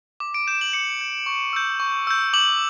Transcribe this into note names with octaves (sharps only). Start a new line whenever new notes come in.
D6
D7
G6 E7
F#7
D6 C#7
G6
C#6
E6 G6
C#6
E6 G6
D6 F#7